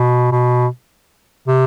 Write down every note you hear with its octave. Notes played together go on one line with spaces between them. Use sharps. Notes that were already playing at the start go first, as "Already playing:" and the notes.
Already playing: B2
B2
C3